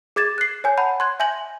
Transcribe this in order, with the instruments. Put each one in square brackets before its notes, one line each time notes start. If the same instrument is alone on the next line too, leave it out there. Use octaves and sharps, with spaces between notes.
[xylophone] G#4 D6 G#6 A6 E7
F#6 C7
C#5 G#5 G6
F#5 A5 B5 G6
C6 F#6 G#6
E5 G#5 G6 A#6 F#7